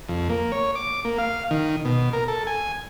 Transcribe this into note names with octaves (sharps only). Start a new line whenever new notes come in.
F2
A#3
C#5
D6
A#3
F5
D#3
B2
A#4
A4
G#5